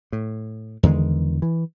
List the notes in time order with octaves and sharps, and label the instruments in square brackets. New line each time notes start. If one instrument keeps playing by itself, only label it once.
[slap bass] A2
E2 D3 D#3 G#3
E3